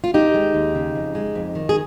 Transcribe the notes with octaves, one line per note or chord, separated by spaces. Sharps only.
F4
D#2 D#4 G4
G#3
D#2
C#3
F2
G#3
F2
D#3
G#4